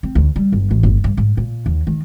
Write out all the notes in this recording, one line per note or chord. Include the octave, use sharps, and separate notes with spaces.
C4
D2
G3
G1
A1
G1
G2
G#2
A#2
D#2
D#3